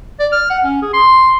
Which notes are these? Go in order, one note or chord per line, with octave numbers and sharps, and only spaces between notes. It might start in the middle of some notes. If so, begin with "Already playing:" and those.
D5
F6
F#5
C#4
G#4
C6